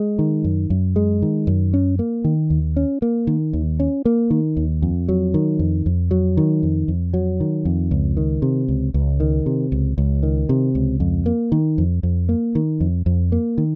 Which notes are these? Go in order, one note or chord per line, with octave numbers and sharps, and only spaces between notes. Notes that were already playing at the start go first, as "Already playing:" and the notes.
Already playing: G#3
D#3
F#2
F#2
G#3
D#3
F#2
C#4
A#3
D#3
D#2
C#4
A#3
D#3
D#2
C#4
A#3
D#3
D#2
F2
F#3
D#3
F2
F2
F#3
D#3
F2
F2
F#3
D#3
F2
C#2
D#3
C3
C#2
C#2
D#3
C3
C#2
C#2
D#3
C3
C#2
F2
A#3
D#3
F2
F2
A#3
D#3
F2
F2
A#3
D#3